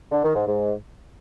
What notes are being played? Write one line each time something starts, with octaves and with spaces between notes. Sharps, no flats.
D3
D#3
G#2
G#2